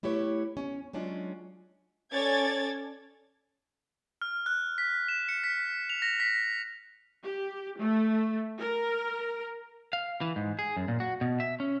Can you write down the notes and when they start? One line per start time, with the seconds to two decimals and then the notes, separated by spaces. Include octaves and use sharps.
0.03 A3 E4 G4 B4 C#5
0.57 C#4
0.93 F#3 G#3 C#4 D4 F4
2.13 C#4 A4 C#5 D5 G#6 A6
4.22 F6
4.46 F#6
4.78 B6
5.08 E7
5.29 C#7
5.44 B6
5.90 F7
6.02 A#6
6.20 B6
7.22 G4
7.79 A3
8.60 A#4
9.93 F5
10.21 E3
10.36 G#2
10.59 G#4
10.77 F#2
10.88 A#2
11.00 F#4
11.21 B2
11.40 E5
11.60 C#4